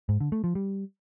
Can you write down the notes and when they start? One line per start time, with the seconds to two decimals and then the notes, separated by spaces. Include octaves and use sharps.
0.09 G#2
0.21 D3
0.32 A3
0.44 F3
0.55 G3